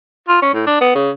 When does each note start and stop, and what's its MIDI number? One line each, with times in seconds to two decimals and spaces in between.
0.28 0.40 65
0.42 0.51 61
0.54 0.62 45
0.67 0.81 62
0.81 0.91 59
0.95 1.10 49